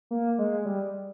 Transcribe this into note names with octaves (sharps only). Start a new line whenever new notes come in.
A#3
G#3
G3